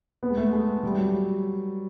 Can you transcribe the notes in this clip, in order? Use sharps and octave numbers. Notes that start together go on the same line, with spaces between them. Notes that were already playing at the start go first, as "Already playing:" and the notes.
B3
G#3
A3
G#3
G3
F#3